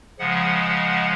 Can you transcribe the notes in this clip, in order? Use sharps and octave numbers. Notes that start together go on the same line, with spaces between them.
C#3 F3 G#3 F#5